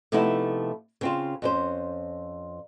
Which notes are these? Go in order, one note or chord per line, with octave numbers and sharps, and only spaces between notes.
C3 F3 A3 B3 D#4 E4
C#3 C4 F4
F2 C#4 C5